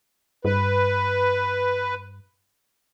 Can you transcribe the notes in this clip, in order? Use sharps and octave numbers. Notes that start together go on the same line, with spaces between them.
G2 B4